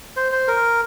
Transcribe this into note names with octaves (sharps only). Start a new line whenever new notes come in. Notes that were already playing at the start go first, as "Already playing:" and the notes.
C5
C5
A#4